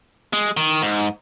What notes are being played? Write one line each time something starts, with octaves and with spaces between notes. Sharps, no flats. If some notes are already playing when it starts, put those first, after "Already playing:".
G#3
D#3
G#2